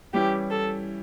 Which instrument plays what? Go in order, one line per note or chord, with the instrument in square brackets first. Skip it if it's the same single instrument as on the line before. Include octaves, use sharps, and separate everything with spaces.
[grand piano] E3 G3 C#4 E4 [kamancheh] G4
[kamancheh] A4